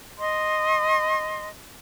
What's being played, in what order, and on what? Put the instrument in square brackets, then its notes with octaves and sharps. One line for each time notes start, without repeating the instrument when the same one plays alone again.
[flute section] D#5 C6